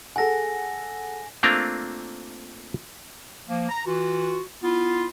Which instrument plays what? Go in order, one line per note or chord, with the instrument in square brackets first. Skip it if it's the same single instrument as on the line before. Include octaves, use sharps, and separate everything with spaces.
[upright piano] G#4 A4 F#5 [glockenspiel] G#5 A#6
[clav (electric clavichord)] A3 A#3 C4 D4 F4 A#4
[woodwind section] F3 A#3
A#5
E3 F4 F#4
B3 E4 F4